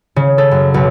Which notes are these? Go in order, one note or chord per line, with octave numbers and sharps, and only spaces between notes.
C#3
A4
F#2
B1